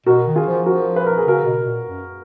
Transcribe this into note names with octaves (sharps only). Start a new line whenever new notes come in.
B2 F#4 A#4
D#3
F4 G#4
F3
F3 F#4 A#4
B4
A#4
G#4
C#3 F#4 A#4
B2
A#2
F#2